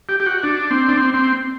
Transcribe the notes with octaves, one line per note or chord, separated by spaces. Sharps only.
G4
G4
F#4
D4
C4
D4
C4
C4